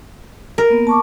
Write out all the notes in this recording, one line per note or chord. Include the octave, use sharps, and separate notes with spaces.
A#4
A#3 B3
A5 C#6 D6